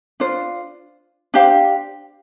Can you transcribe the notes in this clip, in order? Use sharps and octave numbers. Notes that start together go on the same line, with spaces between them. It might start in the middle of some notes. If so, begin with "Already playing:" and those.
D4 F4 C5
D4 G4 C5 F5